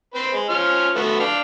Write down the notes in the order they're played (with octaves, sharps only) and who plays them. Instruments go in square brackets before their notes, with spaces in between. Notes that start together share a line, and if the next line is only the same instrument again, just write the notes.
[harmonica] C4 B4 C5
G#3
F3 C#4 F6
A3 B3 F#4
D4 F5 G5